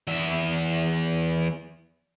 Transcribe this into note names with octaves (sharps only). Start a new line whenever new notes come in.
E2 E5